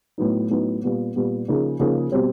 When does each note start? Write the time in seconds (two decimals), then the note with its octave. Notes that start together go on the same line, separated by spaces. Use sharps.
0.18 A2 F#3 B3 D#4
0.50 A2 F#3 B3 D#4
0.83 A#2 G3 B3
1.16 A#2 G3 B3
1.48 C#3 F3 A#3 D#4 G#4
1.79 C#3 F3 A#3 D#4 G#4
2.12 B2 G3 C4